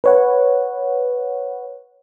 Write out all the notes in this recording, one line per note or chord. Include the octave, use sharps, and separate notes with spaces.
B4 C#5 F#5